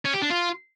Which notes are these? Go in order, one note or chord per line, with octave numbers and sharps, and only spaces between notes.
C#4
G4
D4
F4